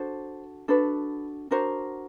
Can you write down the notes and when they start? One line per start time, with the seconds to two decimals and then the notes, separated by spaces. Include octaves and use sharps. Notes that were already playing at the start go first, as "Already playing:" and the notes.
Already playing: D4 F#4 A4 C5
0.68 D4 F#4 A4 B4
1.51 D4 F#4 A#4 C5